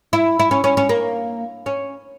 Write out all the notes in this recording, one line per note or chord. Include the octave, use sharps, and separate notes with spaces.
E4
E4
C#4
C#4
C#4
A#3
C#4